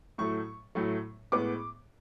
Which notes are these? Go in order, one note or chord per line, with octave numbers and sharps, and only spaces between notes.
A2 F#3 A3 C#6
A2 F#3 A3
A2 G#3 B3 D6